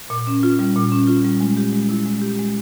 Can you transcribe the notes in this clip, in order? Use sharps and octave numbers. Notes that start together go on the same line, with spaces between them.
A#2
C#4
F4
G3
A#2
C#4
F4
G3
G#3
G4
G#3
E4
G#3
G4
G#3